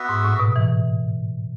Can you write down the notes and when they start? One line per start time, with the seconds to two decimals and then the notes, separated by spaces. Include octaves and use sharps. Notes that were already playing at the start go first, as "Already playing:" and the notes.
Already playing: B3 F#4 B4 E5
0.09 G#2
0.25 A2
0.40 B2
0.56 E3